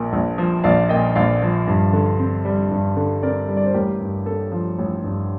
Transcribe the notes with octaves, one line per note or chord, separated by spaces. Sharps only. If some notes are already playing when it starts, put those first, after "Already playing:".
Already playing: A#1 A#2
A#1
F3
A#1 D5 F5
A#2 D#5 G5
A#1 D5 F5
F3
G2
D3
C4
G3
G2
D3
C4 A#4 D5
G3
D5
C5
A1 G4 A#4
G2
A#3 A4
F3
A1
G2